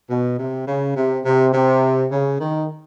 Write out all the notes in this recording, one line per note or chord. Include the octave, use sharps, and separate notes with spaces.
B2
C3
C#3
C3
C3
C3
C#3
D#3